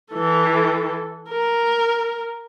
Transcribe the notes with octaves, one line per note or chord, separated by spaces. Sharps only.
E3 A4
A#4